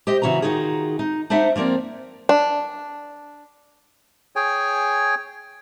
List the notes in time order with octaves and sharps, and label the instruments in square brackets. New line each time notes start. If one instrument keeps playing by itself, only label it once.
[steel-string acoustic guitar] G4 C5 D#5
C#3 E3 F#4 B4 A#5
D#3 D#4 F4 F#4 G#4
D#4
D4 D#4 C5 E5 F#5
F3 A#3 C4 A#4 D5
[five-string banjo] D4
[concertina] G#4 C#5 G5 G#5